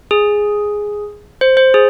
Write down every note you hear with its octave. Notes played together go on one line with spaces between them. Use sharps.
G#4
C5
C5
G#4